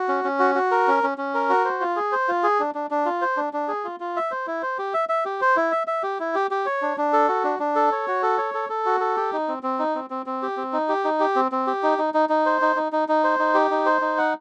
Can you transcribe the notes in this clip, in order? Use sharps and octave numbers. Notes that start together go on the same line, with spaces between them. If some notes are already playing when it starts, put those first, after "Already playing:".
Already playing: F#4
C#4
C#4
F#4
F#4
A#4
C#4
C#4
C#4
A#4
F#4
C5
F4
G#4
C5
F4
G#4
D4
D4
D4
F4
C5
D4
D4
G#4
F4
F4
E5
C5
E4
C5
G4
E5
E5
G4
C5
E4
E5
E5
G4
E4
G4
G4
C#5
D4
D4
A4
F#4
D4
D4
A4
C#5
F#4
A4
C#5
A4
A4
F#4
A4
G4
D#4
C4
C4
D#4
C4
C4
C4
G4
C4
D#4
G4
D#4
G4
C4
C4
G4
D#4
D#4
D#4
D#4
C5
D#4
D#4
D#4
D#4
C5
D#4
G4
D#4
C5
D#4
F#5